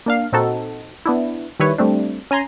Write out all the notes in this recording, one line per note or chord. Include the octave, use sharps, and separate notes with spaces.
A#3 D4 F5
A#2 C4 D#4 F#4 A4
B3 D4 E4
D#3 G3 E4 B4 C#5
G3 A3 C4 D4
C#4 G#5 A#5 C6